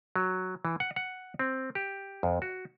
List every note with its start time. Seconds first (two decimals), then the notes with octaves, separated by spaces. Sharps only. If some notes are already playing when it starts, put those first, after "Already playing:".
0.16 F#3
0.65 E3
0.80 F#5
0.96 F#5
1.39 C4
1.75 G4
2.23 F2
2.42 F#4